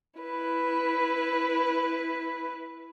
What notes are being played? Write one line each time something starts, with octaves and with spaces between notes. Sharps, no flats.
E4 B4